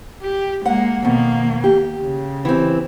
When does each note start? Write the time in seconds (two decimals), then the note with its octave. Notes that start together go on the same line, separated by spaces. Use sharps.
0.22 G4
0.66 G#3 A#3 F#5
1.02 F2 B2 D#3 A#3
1.64 G4
2.00 C#3
2.45 E3 C4